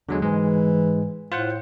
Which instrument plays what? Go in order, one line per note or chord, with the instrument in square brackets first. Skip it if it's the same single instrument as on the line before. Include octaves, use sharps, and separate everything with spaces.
[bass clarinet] E2 [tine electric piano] D3 F#3 G#3
[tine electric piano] G#2 G#3 [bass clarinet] E3
[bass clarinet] A2 [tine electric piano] F4 C5 F#5